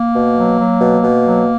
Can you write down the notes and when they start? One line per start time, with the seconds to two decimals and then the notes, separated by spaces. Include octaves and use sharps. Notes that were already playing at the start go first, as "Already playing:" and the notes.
Already playing: A#3
0.15 B2
0.38 F#3
0.59 F#3
0.80 B2
1.03 B2
1.25 F#3